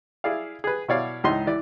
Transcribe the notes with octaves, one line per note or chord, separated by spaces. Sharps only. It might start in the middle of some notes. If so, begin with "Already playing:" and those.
E4 G#4 D5 F5
G#4 B4
B2 E4 C#5 D5 F5
C#2 G#2 E3 D#4 D#5 C6
E3 D5